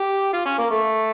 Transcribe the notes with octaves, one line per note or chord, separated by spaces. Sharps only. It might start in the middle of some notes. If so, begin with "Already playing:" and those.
Already playing: G4
F4
C#4
A#3
A3